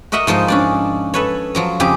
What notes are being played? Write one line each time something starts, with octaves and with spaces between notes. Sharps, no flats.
F#4 A#4 D#5 E5 F#5
G#2 F3 D#4 C5
C#4 D4 D5
A4 B4 C#5
F3 F#3 A#5
F2 C#3 G4 G#4